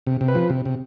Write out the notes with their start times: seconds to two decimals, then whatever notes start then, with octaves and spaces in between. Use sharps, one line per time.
0.07 C3
0.21 C3
0.28 B4
0.35 F3
0.50 C3
0.65 C3